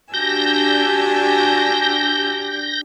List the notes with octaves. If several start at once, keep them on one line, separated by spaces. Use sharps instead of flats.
D4 F#4 G4 G#5 A5 E6 G6 A#6